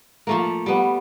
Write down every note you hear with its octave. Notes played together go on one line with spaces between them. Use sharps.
F3 A3 A#3
G3 B3